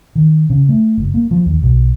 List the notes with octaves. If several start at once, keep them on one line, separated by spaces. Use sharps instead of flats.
D#3
C#3
A3
F#1
A#3
F3
D#2
B1